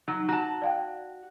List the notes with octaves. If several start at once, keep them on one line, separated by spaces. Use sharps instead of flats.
F#3 D#4
F#4 A5 A#5
D5 F5 G5